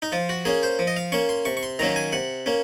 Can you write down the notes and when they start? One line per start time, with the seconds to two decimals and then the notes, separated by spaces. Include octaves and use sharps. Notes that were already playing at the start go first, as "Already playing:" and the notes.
0.02 D#4
0.12 F3 F4
0.29 F#4
0.45 A#3 C#4 G#4
0.63 C5
0.79 F3
0.87 D#5
0.97 F5
1.12 A#3 C#4 C#6
1.29 C6
1.45 C3 C#6
1.57 C#6
1.63 C6
1.79 D#3 F#3 A#3 C#4 A#5
1.96 G#5
2.12 C3 F#5
2.46 A#3 C#4